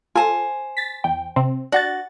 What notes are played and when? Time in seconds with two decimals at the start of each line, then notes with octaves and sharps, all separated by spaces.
0.15 F4 A4 C5 G#5
0.77 A6 B6
1.04 E2 G5
1.36 C3 C4
1.72 D4 F#4 F#5 A6